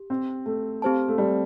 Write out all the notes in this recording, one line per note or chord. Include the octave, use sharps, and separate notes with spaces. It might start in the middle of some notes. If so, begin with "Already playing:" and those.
Already playing: G4
C4
A3
C4 G4 C5 A5
A3
G3